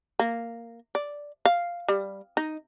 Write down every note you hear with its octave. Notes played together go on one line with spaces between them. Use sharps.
A#3
D5
F5
G3
D#4